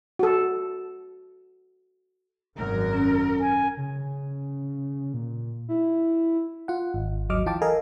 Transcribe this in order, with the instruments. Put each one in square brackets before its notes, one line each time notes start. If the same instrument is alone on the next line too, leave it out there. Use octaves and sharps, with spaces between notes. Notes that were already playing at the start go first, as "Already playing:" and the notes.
[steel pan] F#4 A4
[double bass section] G#1 F#2 F#3 [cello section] A#4
[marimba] C#4
[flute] G#5
[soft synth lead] C#3
A#2
E4
[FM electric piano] F4 F#5
G#1
G#1 D2 F#3 D#5 D6 F6
E3 F4 G5 A5 D6
A4 A#4 D#5 F5 G#5 A#5